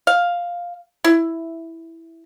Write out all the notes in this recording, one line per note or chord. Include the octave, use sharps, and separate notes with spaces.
F5
E4